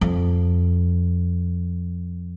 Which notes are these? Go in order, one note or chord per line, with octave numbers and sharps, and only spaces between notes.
F2